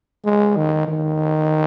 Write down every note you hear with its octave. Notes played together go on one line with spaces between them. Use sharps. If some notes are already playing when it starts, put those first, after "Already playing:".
G#3
D#3
D#3